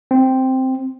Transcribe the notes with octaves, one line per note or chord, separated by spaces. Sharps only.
C4